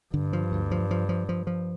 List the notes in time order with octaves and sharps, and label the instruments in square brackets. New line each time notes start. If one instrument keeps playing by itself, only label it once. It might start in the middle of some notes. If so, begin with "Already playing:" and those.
[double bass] G2 [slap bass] D3
[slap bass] F3
D2
F3
F3
F3
F3
F3